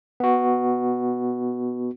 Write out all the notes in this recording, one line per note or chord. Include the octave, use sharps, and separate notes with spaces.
B3 F#4